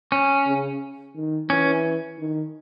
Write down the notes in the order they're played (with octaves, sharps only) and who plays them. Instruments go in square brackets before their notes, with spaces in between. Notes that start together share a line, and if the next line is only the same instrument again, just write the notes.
[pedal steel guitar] C#4
[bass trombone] C#3
D#3
[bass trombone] E3 [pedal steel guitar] C#4
[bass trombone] D#3